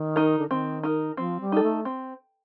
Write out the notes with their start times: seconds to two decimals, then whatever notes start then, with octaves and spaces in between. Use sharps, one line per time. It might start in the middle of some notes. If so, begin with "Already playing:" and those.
Already playing: D#3
0.16 D#4 A#4
0.39 D3
0.50 D#3 C4
0.83 D#4 A#4
1.17 F3 C4
1.41 G3
1.52 D#4 A4
1.63 A3
1.85 C4